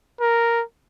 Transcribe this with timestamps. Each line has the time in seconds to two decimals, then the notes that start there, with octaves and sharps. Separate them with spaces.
0.20 A#4